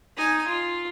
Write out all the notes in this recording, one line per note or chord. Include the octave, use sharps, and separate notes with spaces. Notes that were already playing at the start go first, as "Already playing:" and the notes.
D#4 G#5
F4